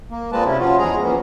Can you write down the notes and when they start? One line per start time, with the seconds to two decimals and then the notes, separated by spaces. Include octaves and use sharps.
0.11 A#3
0.32 A#2 G#3 A#3 C4 B4 A5
0.46 C3 C#4 E4
0.59 F3 C#4 F4 F#4
0.78 E2 G#3 G#4 A#5
1.02 E3 F3 A#3 B3 C#4